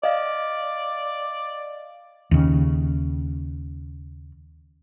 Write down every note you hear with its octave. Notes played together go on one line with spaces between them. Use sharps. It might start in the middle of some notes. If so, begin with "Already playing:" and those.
D5 D#5 F5
D#2 C#3